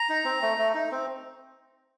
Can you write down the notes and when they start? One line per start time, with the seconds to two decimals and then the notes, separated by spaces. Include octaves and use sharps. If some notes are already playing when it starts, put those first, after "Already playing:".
Already playing: A#5
0.09 D#4
0.25 C4
0.42 A3
0.58 A3
0.74 D#4
0.91 C4